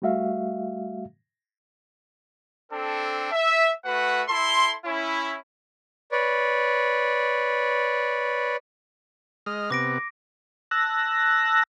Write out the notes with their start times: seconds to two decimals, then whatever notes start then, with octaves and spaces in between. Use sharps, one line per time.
0.02 G3 A3 F#4 E5 F5
2.72 C4 D4 A4
3.32 E5
3.85 A3 F#4 B4 F#5
4.29 E4 A4 C6
4.86 C#4 E4
6.12 B4 C#5 D5
9.46 G#3 D#5 F6
9.70 C3 B3 D6 A#6 D7
10.71 A5 E6 F#6 A#6